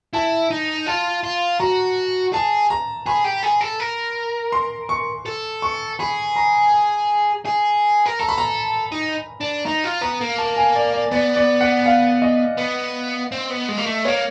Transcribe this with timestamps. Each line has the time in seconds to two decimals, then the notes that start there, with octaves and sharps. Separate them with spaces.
0.14 E4 A5
0.50 D#4
0.86 F4 A5
1.24 F4
1.60 F#4 A#5
2.33 G#4 A5
2.70 A#5
3.06 G#4 B5
3.24 G4
3.43 G#4
3.61 A4
3.80 A#4
4.52 C6
4.89 C#6
5.26 A4
5.62 C#6
5.99 G#4 B5
6.36 A#5
7.45 G#4
8.06 A#4
8.19 A4 A#5
8.29 B5
8.38 A#5
8.92 D#4
9.41 D4
9.65 D#4 A#5
9.84 F4
10.02 B3 A#5
10.21 A#3
10.38 A5
10.56 G#5
10.75 D5
10.93 D5
11.11 B3 D5
11.36 D5
11.61 F#5
11.86 F5
12.22 D#5
12.58 B3
13.32 C4
13.50 B3
13.69 G#3
13.78 A#3
13.86 A3
14.05 A#3 C#5